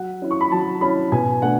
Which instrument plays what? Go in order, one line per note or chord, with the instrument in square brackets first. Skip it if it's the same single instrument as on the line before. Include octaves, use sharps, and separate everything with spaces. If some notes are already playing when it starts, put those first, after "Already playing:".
Already playing: [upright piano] F#3 F#5
C#4 E4
C#6
B5
F#3 A5
C#4 E4 B5
B2 G#5
A3 D4 F#5